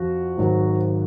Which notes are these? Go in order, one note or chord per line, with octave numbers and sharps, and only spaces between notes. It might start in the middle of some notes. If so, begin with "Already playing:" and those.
Already playing: F2 F3 F#4
G#1 G#2 F#3